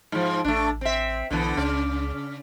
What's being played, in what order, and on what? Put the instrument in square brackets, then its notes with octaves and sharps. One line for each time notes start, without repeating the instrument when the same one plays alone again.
[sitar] G#2 F3
[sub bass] A1 [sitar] A3 D4
[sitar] C4 E5
[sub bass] B1 [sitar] D3 E3 B3
[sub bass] C#2 [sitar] C#3 D5